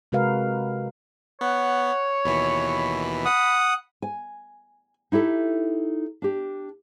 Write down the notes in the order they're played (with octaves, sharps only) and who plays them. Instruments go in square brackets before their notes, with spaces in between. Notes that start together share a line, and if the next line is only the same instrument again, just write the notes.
[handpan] C3 G#3 F#4 A#4 B4 F5
[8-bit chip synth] B3 [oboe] C#5 [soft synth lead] F#5
[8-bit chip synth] D#2 B2 E3 [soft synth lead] B5
[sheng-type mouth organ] F#5 D#6
[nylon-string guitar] G#5
D#4 E4 G4 A4
D4 G4